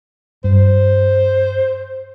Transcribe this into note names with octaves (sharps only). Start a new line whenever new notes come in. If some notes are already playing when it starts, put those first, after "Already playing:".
G2 C5